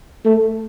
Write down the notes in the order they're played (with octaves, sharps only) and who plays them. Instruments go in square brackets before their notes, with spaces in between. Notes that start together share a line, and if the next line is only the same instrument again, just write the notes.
[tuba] A3